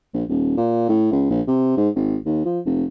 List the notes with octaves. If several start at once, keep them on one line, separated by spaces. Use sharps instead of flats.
A#1
D#1
A#2
A2
C#2
A#1
C3
G#2
G#1
D#2
F3
F1